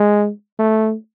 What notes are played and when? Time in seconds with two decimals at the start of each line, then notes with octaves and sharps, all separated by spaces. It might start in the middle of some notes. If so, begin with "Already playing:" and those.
Already playing: G#3
0.59 A3